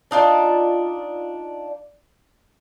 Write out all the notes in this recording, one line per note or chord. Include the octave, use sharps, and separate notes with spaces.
D4 D#4 F4 D5